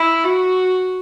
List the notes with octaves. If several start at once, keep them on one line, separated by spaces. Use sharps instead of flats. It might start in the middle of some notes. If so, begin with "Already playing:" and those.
Already playing: E4
F#4